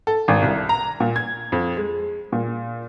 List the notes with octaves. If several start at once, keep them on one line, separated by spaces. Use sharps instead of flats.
A4
G#1
C2
A#5
A#2
G#6
F2
G#3
A#2